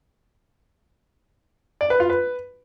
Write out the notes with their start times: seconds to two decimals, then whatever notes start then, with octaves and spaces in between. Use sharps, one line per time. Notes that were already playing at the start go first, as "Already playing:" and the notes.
1.81 D5
1.90 B4
2.00 F4
2.10 B4